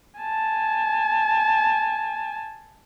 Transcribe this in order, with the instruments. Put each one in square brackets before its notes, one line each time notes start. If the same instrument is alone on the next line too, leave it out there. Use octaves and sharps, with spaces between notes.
[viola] G#5 A5